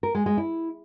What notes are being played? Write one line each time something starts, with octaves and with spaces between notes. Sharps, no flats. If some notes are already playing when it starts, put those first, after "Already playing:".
A#4
G#3
G#3
E4